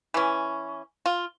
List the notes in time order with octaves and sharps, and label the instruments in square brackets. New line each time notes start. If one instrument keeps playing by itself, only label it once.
[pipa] E3 C#4
F4